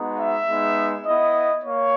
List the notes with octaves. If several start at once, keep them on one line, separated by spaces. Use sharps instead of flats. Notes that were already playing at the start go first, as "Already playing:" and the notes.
Already playing: G#3 B3 D#4 F#4
E5
G#3 B3 D#4
B3 E4 D#5
A#3 C#5